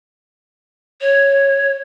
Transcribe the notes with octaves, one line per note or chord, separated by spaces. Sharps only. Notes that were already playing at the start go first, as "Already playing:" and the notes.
C#5